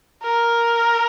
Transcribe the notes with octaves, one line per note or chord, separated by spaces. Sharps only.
A#4